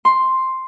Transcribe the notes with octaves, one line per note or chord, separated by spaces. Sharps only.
C6